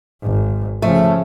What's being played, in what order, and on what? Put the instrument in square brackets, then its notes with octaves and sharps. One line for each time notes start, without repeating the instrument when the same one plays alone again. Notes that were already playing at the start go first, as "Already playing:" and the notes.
[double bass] G#1
[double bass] C#3 F3 [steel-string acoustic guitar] A3